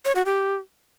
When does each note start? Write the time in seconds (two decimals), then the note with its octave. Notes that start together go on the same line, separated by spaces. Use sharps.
0.05 C#5
0.15 F#4
0.26 G4